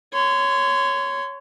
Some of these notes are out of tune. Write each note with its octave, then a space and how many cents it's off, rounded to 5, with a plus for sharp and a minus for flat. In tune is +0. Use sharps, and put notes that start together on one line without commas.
C#5 +0 C6 -30